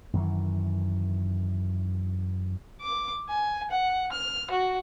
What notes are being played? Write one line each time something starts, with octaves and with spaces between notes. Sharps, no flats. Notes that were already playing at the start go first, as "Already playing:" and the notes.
F#2 D#3 E3
D6
G#5
F#5
F6
F#4